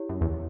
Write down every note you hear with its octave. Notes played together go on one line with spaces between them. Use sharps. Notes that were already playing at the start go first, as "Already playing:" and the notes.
Already playing: E4 G4 C#5
F#2
E2